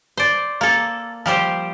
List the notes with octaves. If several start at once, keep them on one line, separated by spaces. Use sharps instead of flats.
C5 D5
A#3 A4
F3 G3 G4 C5